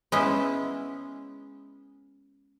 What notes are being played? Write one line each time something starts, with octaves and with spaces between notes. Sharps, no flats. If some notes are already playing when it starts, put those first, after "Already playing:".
G#3 B3 C#4 E4